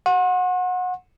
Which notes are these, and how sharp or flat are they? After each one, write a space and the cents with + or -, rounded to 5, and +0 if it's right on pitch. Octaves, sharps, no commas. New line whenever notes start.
F#5 -25 C6 +45